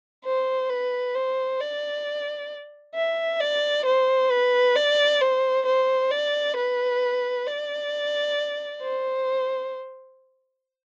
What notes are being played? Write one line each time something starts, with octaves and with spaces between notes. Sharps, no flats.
C5
B4
C5
D5
E5
D5
C5
B4
D5
C5
C5
D5
B4
D5
C5